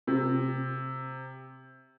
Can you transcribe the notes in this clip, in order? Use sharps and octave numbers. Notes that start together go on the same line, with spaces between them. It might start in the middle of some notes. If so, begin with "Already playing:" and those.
C3